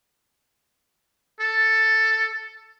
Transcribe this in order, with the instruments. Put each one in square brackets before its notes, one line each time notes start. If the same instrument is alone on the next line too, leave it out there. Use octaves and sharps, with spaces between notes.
[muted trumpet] A4